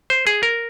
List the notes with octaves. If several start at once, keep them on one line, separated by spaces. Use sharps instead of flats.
C5
G#4
A#4